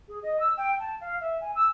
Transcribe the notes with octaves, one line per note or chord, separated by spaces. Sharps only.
G#4
D#5
E6
G5
A5
F5
E5
G#5
E6